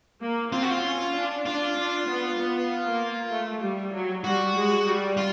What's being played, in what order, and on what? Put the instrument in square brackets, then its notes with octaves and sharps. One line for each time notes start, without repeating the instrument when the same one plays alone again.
[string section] A#3
[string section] C4 [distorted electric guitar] F4
[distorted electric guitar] F#4
F4
[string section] C#4
D4
[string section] D4 [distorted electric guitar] F4
[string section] D4
B3
B3
A#3
A3
G3
F#3
[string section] G3 [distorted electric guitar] F#4
[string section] G#3
G3
[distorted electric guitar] F4